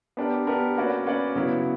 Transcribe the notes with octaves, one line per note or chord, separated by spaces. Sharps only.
B3 D4 G4 A#4
B3 D4 G4 A#4
A#3 C#4 F#4 B4 D5
A#3 C#4 F#4 B4 D5
C#3 F#3 B3 E4